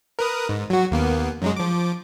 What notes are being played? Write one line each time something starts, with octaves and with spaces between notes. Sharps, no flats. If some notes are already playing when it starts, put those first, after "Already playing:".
A#4 B4 D#6
G#2
F#3 F#4
D#2 A#3 B3
F#2 F#3 G#3
F3 D6